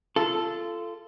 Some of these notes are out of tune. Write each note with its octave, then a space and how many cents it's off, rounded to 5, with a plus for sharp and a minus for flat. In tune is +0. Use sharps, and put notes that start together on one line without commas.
F4 -25 A4 +0